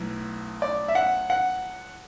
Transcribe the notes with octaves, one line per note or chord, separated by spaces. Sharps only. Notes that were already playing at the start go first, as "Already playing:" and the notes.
Already playing: B1 A2
D5
E5
F#5
F#5